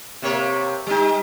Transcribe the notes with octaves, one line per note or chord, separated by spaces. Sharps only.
C3 A#3 C#5
G3 D#4